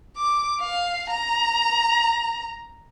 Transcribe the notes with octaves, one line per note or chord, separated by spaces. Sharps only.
D6
F5
A#5